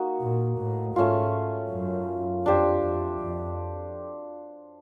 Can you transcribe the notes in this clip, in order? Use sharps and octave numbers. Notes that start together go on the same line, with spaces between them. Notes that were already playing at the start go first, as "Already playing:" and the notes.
Already playing: A#3 D#4 F#4
A#2
A2
G#2 A3 C#4 F4
F#2
F2 D4 G4 C5
F2
F2